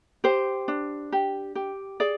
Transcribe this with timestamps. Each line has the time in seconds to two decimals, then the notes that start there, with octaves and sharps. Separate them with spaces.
0.24 G4 C5
0.68 D4
1.12 G4
1.55 G4
2.00 G#4 D5